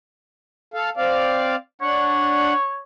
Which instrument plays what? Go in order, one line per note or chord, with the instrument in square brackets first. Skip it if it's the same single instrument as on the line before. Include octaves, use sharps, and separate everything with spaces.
[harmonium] A4 F5
C4 D5 F5
[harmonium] D4 F#5 [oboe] C#5